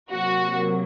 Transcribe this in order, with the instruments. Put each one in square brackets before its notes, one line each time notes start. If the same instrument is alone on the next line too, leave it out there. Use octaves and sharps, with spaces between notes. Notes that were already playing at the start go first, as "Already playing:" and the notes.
[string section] C3 F#3 A#3 F#4